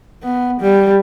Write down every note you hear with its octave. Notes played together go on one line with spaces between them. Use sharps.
B3
G3